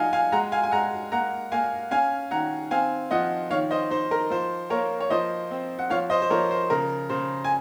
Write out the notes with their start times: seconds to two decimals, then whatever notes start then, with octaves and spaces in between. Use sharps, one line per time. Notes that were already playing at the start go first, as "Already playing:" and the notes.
Already playing: F3 D#4 F5 F#5 G#5
0.13 F5 G#5
0.32 G#3 F#5 A#5
0.52 F5 G#5
0.64 G#5
0.71 G#3 F#5 A#5
1.11 A#3 F#5 A#5
1.52 A#3 F5 G#5
1.91 C#4 F5 G#5
2.31 D#3 F#5 A#5
2.71 C4 F5 G#5
3.11 F3 D#5 F#5
3.51 D#3 C#5 F5
3.71 C5 D#5
3.90 D#4 C5
4.11 A#4
4.30 F3 C5
4.70 A#3 A#4 C#5
5.00 C#5
5.10 F3 C5 D#5
5.51 C4
5.79 F#5
5.90 F3 C#5 F5
6.10 C5 D#5
6.22 C5
6.30 F3 A#4 C#5
6.51 C5
6.70 C#3 A#4
7.10 C#3 C5
7.44 G#5